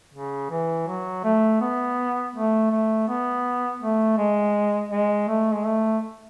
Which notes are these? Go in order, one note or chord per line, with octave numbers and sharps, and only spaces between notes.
C#3
E3
F#3
A3
B3
A3
A3
B3
A3
G#3
G#3
A3
G#3
A3